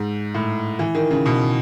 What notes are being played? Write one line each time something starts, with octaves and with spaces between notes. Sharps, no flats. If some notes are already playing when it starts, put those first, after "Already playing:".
Already playing: G#2
A2
E3
D#3
C#3
B2